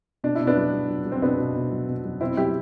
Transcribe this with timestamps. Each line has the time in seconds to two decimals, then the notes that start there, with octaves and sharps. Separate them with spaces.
0.24 B2 D4
0.35 E4
0.41 B2
0.47 B3 D4
0.57 F#3
0.73 F#3
0.90 F#3
1.06 F#3
1.12 C4
1.22 B2 B3 D4
1.39 B2
1.56 B2
1.72 F#3
1.88 B2
2.05 F#3
2.21 B2 C4 E4
2.37 F#3 E4 G4